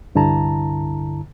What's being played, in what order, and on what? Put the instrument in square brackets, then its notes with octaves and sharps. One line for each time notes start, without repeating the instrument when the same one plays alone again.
[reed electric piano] C2 G2 D3 E4 A5 A#5